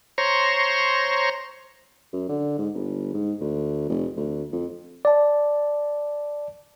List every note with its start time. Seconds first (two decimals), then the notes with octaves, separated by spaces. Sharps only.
0.18 C5 C#5 A#5 C6 C#6
2.13 F#2
2.29 D3
2.58 G#2
2.75 G1
3.14 G#2
3.41 D2
3.89 F1
4.17 D2
4.53 F2
5.05 D5 A5